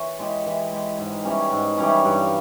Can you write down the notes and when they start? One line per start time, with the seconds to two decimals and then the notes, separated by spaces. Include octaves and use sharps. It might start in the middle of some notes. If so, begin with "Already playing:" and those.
Already playing: E3 C#5
0.19 G#3 E4 G4
0.46 E3
0.72 G#3 E4 G4
0.98 G#2
1.25 E3 G3 C#4
1.52 G#2
1.78 E3 G3 C#4
2.05 G2